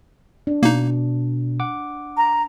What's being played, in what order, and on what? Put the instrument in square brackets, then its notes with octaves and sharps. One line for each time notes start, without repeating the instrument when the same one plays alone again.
[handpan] D4
[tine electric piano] B2 [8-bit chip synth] A#3 D#4
[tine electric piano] F#5 D6
[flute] A#5